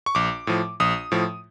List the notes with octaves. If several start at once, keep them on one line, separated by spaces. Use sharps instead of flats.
C#6
A#1 D6
A2 F3
A#1 D#6
A2 F3